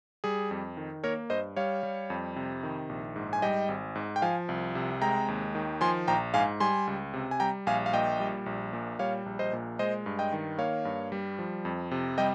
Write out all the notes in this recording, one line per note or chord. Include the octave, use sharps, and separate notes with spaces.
G3 G#4
F2
D#3
A#3 A#4 C#5
G2 C5 D#5
G3 C#5 F5
G3
F2
C3
D#3
A#1
G#2
G#5
G3 D#5 G5
G#1
G#2
G5
F3 F5 G#5
C2
C3
G#3 G5 A#5
D#2
D#3
F3 G#5 C6
A#1 G5 A#5
G#2 F5 G#5
G3 G#5 C6
C#2
C3
G#5
G3 G5 A#5
A#1 F5 G#5
F5
A#2 D#5 G5
G3
A#1
A#2
G3 C#5 F5
A#1
C5 D#5
A#2
G#3 C5 D#5
G2
D#5 G5
D#3
A#3 C#5 F5
G2
G3
F3
F2
C3
G3 D#5 G5